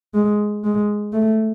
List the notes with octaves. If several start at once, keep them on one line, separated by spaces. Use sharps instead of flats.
G#3
G#3
A3